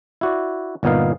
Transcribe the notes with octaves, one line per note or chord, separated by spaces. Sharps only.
E4 F#4 D5
G1 A#2 B3 D#4 F5